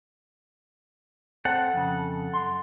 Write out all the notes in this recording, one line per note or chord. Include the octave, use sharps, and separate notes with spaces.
C4 A4 F#5
F2 C#3
F#2 C6